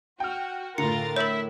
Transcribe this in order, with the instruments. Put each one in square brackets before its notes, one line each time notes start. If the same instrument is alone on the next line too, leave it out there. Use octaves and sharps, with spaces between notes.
[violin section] F#4 [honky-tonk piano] G5 F6
[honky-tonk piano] A2 D3 [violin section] F4 A#4 A6 [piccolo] A#5 [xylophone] C#7
[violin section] E4 [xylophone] A#4 C#5 [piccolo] E5